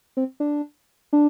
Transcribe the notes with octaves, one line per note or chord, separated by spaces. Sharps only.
C4
D4
D4